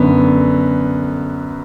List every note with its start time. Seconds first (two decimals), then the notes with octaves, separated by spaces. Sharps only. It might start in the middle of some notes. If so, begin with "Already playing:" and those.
Already playing: F#2 D3 B3